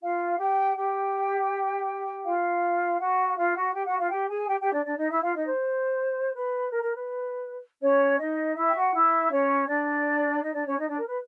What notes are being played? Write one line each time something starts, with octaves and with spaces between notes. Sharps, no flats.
F4 F5
G4 G5
G4 G5
F4 F5
F#4 F#5
F#5
F4 F5
F#4 F#5
G4 G5
F#4 F#5
F4 F5
G4 G5
G#4 G#5
G4 G5
G4 G5
D4 D5
D4 D5
D#4 D#5
E4 E5
F4 F5
D#4 D#5
C5
B4
A#4
A#4
B4
C#4 C#5
D#4 D#5
E4 E5
G5
F#4 F#5
E4 E5
C#4 C#5
D4 D5
D#4 D#5
D4 D5
C#4 C#5
D#4 D#5
D4 D5
A#4
B4